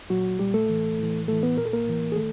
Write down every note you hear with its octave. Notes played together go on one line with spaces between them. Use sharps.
A#2 F#3 F#4
A#2 G3 G4
A3 A4
A2 E3
A2 E3
A2 E3 A3 A4
B3 B4
A#2 A#4
A4
A#3 A#4
A2 E3
G#4
D#3 A3 A4